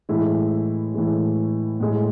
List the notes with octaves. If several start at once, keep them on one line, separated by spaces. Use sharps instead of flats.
A2 E3 G#3 E4
A2 E3 G#3
A2 G#3